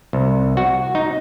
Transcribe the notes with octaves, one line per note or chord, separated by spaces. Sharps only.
C2
F#4
D#4